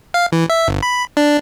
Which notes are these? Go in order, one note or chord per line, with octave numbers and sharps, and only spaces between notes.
F5
E3
E5
G1
B5
D4